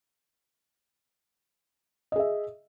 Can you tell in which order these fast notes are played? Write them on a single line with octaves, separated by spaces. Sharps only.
D#5 G#4 E5